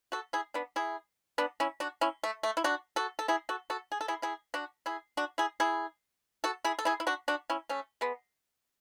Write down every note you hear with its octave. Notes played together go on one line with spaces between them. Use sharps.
F#4 A4
E4 G#4
B3 D4
E4 G#4
B3 D4
C#4 E4
D4 F#4
C#4 E4
A3
A3
E4
D4 F#4
F#4 A4
A4
E4 G#4
F#4 A4
F#4 A4
G#4
A4
E4 G#4
E4 G#4
D4 F#4
E4 G#4
D4 F#4
E4 G#4
E4 G#4
F#4 A4
E4 G#4
A4
E4 G#4
E4
D4 F#4
D4 F#4
C#4 E4
A3 C#4
G#3 B3